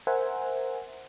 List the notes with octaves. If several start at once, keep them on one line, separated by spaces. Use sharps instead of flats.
A#4 C5 E5 F#5 G#5